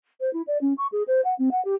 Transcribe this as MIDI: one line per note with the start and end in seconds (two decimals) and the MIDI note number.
0.21 0.32 72
0.33 0.42 64
0.47 0.58 74
0.61 0.73 61
0.78 0.87 85
0.92 1.03 68
1.08 1.21 72
1.25 1.34 78
1.39 1.49 60
1.51 1.63 78
1.65 1.75 67